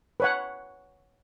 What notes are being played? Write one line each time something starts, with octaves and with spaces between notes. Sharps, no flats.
B4 C#5 F#5